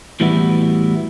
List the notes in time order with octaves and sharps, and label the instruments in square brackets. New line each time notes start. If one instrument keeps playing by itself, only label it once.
[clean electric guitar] A2 E3 G3 B3 E4 F#4